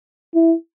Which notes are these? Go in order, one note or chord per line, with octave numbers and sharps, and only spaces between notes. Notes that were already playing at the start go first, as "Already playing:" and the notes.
E4